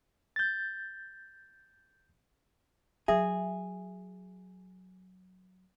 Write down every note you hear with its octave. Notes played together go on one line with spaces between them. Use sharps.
G6 A6
F#3 G#4 E5